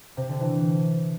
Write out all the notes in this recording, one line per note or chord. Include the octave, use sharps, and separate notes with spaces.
C3
D3
E3